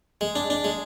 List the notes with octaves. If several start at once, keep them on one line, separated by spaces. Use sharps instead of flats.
G#3
D4
D4
G#3